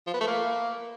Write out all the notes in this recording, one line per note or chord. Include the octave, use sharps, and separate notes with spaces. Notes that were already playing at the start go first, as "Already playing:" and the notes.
F3
B3
A3
A#3